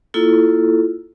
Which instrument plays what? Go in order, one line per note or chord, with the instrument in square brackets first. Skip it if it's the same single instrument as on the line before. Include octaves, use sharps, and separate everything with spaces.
[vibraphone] A#3 E4 F4 A4